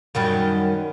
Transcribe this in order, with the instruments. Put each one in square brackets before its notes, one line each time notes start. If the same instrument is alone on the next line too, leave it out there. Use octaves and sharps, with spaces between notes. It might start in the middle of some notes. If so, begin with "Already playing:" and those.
[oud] F#2 D#3 G3